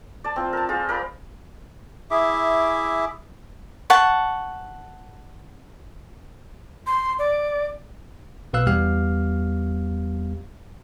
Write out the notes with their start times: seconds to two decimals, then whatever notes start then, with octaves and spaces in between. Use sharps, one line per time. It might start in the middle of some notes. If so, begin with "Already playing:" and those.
0.24 D5 A5
0.36 C4 F4
0.53 A#4 A5
0.69 F4 G#4 C5
0.89 A#4 D5 B5
2.11 E4 G#4 E5 D6
3.90 F#5 A5 C#6
6.87 C6
7.19 D5
8.53 B1 B2 B4 F5 E6 F#6
8.67 E2 G3 B3 G4 F5 F6